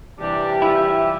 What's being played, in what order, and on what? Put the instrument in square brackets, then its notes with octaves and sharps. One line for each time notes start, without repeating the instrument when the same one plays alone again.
[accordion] C3 E3 G4 [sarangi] G3 [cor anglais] D4
[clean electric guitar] E4 F4 [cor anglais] E5